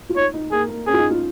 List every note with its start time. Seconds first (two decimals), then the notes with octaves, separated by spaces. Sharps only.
0.09 F4
0.16 D#4 C#5
0.34 D#4
0.52 A#3 G#4
0.69 A#3
0.87 C#4 G#4
0.93 F4
0.99 D#4
1.10 F4